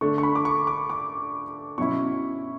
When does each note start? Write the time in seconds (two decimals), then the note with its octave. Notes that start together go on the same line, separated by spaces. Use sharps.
0.01 D3 A3 D4 C#6
0.18 C#6
0.23 B5
0.35 D6
0.45 C#6
0.67 D6
0.90 D6
1.78 B2 F#3 C#4 E4 C#6